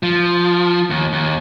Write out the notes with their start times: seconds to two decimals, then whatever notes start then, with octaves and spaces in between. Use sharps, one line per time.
0.03 F3
0.90 D#2
1.13 D#2